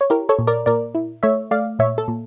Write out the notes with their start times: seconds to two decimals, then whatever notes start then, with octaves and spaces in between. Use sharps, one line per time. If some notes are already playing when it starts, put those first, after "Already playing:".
0.01 C#5
0.10 E4 G4 A#4
0.29 A4 C#5
0.39 A#2
0.47 A#4 D5
0.66 A#2 A#4 D5
0.95 E4
1.23 A3 C#5 E5
1.51 A3 D5 F5
1.79 A#2 C#5 E5
1.98 A4
2.08 A#2